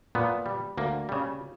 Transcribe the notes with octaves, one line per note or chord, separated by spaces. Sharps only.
A#2 B3
G3
D2 A#3
C#3 G3